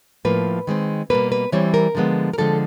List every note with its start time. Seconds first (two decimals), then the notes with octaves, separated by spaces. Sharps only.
0.25 A2 F3 A#3 B4
0.67 D#3 G#3 C4
1.10 B2 G3 A#3 B4
1.32 B4
1.52 E3 G3 C4 C#5
1.74 A#4
1.95 D3 F3 G#3 B3
2.33 A#4
2.38 D3 F3 G#3 C4 A4